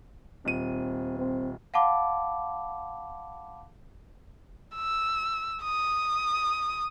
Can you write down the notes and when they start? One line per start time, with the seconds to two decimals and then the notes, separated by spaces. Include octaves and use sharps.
0.45 D#1 C4 D#7
1.19 C4
1.74 F5 F#5 A5 B5 D6
4.76 E6
5.63 D#6